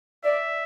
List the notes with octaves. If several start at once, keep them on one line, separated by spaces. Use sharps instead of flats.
D5 E5